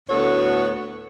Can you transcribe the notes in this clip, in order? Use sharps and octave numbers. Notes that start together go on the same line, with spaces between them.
D2 A2 B3 F#4 A4 C#5